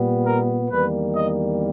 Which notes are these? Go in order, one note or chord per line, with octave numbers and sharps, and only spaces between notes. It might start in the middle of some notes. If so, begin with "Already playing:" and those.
Already playing: A#2 G3 B3
A#4
E2 D#3 G3 A#3 B4
D#5